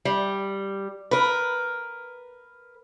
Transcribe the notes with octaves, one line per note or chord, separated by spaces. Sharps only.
G3
A#4 B4